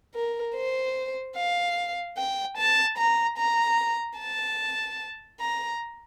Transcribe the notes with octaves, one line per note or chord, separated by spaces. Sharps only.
A#4
C5
F5
G5
A5
A#5
A#5
A5
A#5